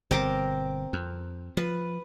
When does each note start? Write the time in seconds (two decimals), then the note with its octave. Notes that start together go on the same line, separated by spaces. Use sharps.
0.11 G1 B2 C4 A#4 D6
0.93 F2
1.57 F3 B4